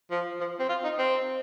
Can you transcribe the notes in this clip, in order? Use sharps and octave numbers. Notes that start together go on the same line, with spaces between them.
F3
F3
C4
F4
D#4
C4